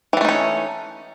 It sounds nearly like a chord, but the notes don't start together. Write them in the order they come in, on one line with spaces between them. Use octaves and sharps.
E3 G3 A3 D#4 C#4